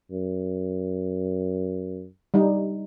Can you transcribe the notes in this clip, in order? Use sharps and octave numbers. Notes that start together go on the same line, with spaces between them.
F#2
G3 D#4